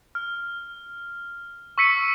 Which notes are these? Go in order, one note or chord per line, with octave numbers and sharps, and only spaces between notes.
F6
C#6 E6 B6 C#7 D#7